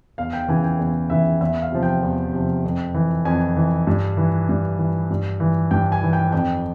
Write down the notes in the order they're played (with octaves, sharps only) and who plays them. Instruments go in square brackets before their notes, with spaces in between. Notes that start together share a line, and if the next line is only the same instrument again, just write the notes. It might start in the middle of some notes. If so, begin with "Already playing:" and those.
[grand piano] E2 F5
G5
C#3 E3 G#5
G5
E2
C#3 E3 E5
E2 E5
F5
C3 F3
G5
E2
C3 F3
F2
E3
F2 G#5
E3
G2
E3
G2
E3
G2
E3
G2 G5
G#5
E3
G5
F2 G5